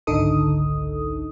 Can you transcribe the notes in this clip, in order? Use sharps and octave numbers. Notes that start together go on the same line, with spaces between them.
G#1 C#2 D3 D#4 A4 D#6